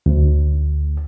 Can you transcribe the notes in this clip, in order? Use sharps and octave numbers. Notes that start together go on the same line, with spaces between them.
D2